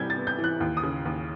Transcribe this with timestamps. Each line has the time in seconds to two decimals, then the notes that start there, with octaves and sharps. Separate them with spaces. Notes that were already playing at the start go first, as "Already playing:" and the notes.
Already playing: C3 E3 G3 G6 G#6
0.10 A6
0.16 B3
0.27 G6
0.39 E3
0.44 F#6
0.60 D#2
0.77 D#6
0.83 C#3
1.05 D#2